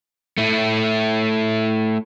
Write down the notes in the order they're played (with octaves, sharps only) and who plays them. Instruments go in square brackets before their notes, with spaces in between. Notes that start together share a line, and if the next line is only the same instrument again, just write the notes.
[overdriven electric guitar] A3 E4